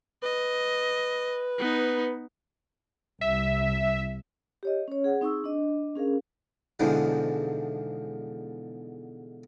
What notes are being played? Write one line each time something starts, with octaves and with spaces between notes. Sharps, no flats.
B4 D#5
B3 D#4
C2 E5
G4 C#5 D#5
C#4 C#5
G#4 F#5
C4 D#4 G#4 C#6 E6
D4 D#5
C#4 G#4 A#4 F5
E2 G#2 B2 D3 E3 F3